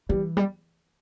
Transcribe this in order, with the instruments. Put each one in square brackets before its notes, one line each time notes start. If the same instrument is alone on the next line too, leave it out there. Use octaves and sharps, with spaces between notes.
[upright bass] E3 [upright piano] G3
[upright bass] G3